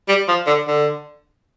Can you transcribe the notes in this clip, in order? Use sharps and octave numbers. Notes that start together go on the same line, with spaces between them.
G3
F3
D3
D3